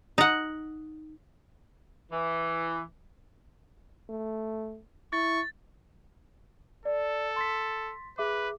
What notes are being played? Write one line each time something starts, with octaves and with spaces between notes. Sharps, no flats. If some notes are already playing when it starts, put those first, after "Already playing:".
D#4 F#5
E3
A3
E4 C#6 A6
A4 D5
C6 A6 B6
G#4 B4 E5 D6